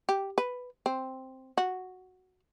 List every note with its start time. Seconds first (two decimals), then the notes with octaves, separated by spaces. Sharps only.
0.09 G4
0.38 B4
0.86 C4
1.58 F#4